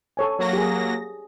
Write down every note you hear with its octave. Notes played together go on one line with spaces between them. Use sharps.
A4 C#5 G#5
F#3 A#3 C#5 A#6
G4 G#4